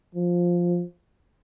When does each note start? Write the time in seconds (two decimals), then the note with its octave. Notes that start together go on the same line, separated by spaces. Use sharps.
0.15 F3